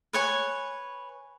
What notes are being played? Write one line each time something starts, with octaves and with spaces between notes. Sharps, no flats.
B4 C#5 G#5